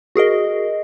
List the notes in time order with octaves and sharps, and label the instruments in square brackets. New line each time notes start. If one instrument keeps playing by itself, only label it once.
[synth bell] F#4 G#4 A#4 D#5